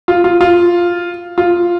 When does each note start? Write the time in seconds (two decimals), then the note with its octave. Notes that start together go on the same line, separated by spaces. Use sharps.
0.08 F4
0.24 F4
0.41 F4
1.38 F4